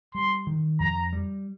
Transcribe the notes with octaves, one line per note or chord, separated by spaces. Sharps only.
G3 C6
D#3
F2 A#5
G3